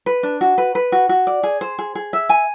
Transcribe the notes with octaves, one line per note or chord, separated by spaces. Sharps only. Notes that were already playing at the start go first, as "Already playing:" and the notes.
B4
D4
F#4
B4
B4
F#4
F#4
D5
G#4
C5
G#4
G#4
E5
G#5